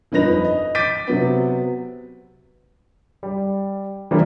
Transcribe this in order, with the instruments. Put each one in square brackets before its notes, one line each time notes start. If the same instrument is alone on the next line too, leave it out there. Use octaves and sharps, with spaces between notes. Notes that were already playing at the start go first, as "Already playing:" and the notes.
[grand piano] G1 F2 D#4 B4 A#6 F7
D#5
D6 G6 A6 B6 D7 D#7
C3 F#3 B3
G3
E3 F3 G3 A#3